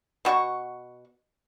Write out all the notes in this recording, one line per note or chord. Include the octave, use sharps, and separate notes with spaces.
B2 F#4 F#5 C#6